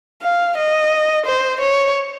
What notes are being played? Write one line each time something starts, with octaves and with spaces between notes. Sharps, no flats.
F5
D#5
C5
C#5